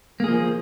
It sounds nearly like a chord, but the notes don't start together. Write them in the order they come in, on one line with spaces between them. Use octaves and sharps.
A#3 G#4 F3